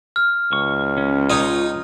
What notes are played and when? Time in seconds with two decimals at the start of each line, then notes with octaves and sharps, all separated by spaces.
0.16 F6
0.53 C#2 C#6
0.98 C#4
1.30 D#4 F4 C#5 D#5